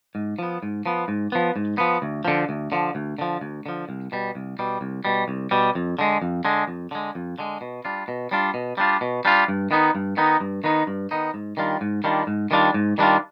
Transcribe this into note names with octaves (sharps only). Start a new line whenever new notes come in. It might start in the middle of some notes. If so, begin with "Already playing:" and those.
G#2
F3 B3
G#2
F3 B3
G#2
F3 B3
G#2
F3 B3
D2
D3 F3
D2
D3 F3
D2
D3 F3
D2
D3 F3
C2
B2 G3
C2
B2 G3
C2
B2 G3
C2
B2 G3
F2
D3 G#3
F2
D3 G#3
F2
D3 G#3
F2
D3 G#3
B2
G3 D4 F4
B2
G3 D4 F4
B2
G3 D4 F4
B2
G3 D4 F4
G2
D#3 B3 D#4
G2
D#3 B3 D#4
G2
D#3 B3 D#4
G2
D#3 B3 D#4
G#2
D#3 G3 D4 F4
G#2
D#3 G3 D4 F4
G#2
D#3 G3 D4 F4
G#2
D#3 G3 D4 F4